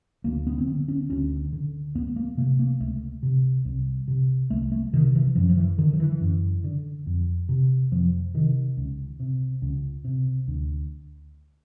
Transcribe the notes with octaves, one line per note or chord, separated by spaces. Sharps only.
D2 A#3
B3
C4
D3 B3
C#4
D2 C#4
D3
C#2 B3
A#3
C3 A#3
A#3
C#2 A3
C3
C2
C3
C2 A3
A3
C3 D#3
E3
F#2 F3
F3
E3
D3 D#3
F3
E3
F#2
D3
F2
C3
F2 F3
C3 D#3
C#2
C3
C#2
C3
D2